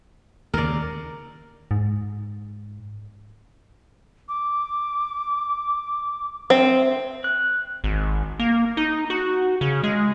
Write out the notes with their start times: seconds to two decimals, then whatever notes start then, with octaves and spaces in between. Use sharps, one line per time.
0.54 D#2 C#3 A#4 D5
1.71 G#2
4.29 D6
6.50 C4 E5
7.24 F#6
7.84 G#1
8.39 A#3
8.77 D#4
9.10 F#4
9.61 C#3
9.83 G#3